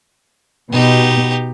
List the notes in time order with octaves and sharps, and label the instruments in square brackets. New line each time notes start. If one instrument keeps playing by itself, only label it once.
[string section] B2 [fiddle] D#4 G4